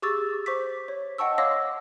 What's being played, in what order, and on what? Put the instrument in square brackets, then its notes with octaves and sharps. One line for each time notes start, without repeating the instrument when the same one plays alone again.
[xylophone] G4 G#4 C#6 D6 E6 A6
C5 C#6 D6 B6
C#5
D#5 F#5 G5 A5 C#6 E6
C#5 F5 C6 D6 E6 A#6